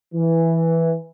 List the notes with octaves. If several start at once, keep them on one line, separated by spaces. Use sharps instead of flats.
E3